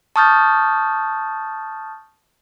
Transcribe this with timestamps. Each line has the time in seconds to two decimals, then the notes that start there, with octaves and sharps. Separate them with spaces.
0.16 A5 C#6 D#6 F6 G6 A6